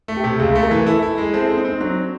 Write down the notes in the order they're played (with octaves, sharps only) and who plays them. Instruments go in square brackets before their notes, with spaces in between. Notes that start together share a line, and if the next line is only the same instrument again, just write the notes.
[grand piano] A3
[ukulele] G4
[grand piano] C3
[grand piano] C#2 [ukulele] G#4
[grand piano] A3
[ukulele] A#4
[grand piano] E3
[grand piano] E4 [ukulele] A4
[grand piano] E4
G#3
[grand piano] C4 [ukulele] A4
[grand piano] C4
[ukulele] D#4
[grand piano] C4
[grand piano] F#3 [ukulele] D4